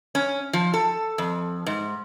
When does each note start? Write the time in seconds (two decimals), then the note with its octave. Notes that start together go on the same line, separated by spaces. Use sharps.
0.15 C#4
0.53 F3
0.74 A4
1.18 F2
1.66 G#2